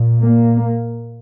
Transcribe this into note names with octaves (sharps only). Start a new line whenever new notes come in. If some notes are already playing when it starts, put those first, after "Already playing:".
Already playing: A#2
A#3